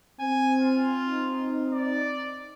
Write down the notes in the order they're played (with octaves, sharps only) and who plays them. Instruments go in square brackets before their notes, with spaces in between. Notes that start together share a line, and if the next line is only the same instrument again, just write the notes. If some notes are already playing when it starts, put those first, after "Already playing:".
[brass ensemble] C4 [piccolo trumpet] G#5
[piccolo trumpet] F4
[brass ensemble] C4 D#4
[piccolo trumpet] D5